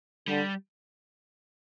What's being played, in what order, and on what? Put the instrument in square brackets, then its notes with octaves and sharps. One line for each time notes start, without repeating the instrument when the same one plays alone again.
[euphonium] D3 [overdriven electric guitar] G3